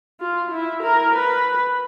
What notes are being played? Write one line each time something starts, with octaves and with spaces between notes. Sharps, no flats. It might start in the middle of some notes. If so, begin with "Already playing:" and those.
F4
E4
A#4
B4